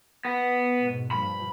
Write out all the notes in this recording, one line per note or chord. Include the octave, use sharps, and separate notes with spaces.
B3
G#2 B2
G2 A#2 F3 B5